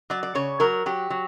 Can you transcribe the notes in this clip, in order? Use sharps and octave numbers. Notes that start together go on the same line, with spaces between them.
F#3 D5
D5
C#3 C#5
F#3 A#4
F#3 G4
F#3